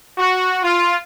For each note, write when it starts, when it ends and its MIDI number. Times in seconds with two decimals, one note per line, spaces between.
0.18 0.58 66
0.62 0.96 65